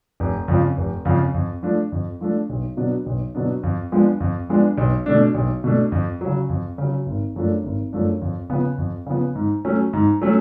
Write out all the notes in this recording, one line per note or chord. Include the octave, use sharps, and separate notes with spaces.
F1
F2 C#3 F3
F1
F2 C#3 F3
F2
F3 A3 D4
F2
F3 A3 D4
B1
B2 F#3 B3 D4
B1
B2 F#3 B3 D4
F2
F3 G#3 B3 D4
F2
F3 G#3 B3 D4
B1
B2 A3 D4
B1
B2 A3 D4
F2
C#3 F#3
F2
C#3 F#3
G#1
F#2 F3 A3 D4
G#1
F#2 F3 A3 D4
F2
C#3 F3 B3
F2
C#3 F3 B3
G#2
F#3 A3 C#4
G#2
F#3 A3 C#4